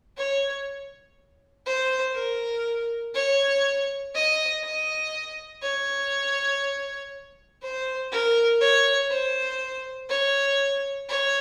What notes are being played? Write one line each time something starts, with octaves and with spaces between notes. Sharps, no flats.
C#5
C5
A#4
C#5
D#5
D#5
C#5
C5
A#4
C#5
C5
C#5
C#5